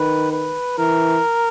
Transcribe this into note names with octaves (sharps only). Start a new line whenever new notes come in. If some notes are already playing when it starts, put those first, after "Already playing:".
Already playing: D#3 B4
B4
E3 A#4